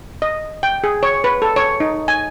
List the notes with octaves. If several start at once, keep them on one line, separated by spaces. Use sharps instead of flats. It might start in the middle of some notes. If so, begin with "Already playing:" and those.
D#5
G5
G#4
C#5
B4
A4
C#5
D#4
G#5